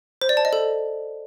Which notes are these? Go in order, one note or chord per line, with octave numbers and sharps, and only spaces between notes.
C5
D5
A5
D#5
A4